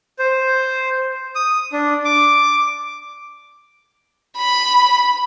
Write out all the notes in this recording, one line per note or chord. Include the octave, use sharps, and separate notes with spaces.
C5
D#6
D4
D6
B5